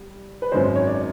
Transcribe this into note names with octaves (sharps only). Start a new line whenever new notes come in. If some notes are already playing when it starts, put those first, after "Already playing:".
Already playing: G3
B4
G#1 F#2 D#3 G#3 C5
C#5
D5